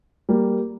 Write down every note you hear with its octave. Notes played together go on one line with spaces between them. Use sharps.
G3 A#3